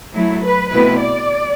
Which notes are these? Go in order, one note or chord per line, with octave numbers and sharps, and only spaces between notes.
F#3 A3 E4
B4
B2 A3 C4 E4 B4
D5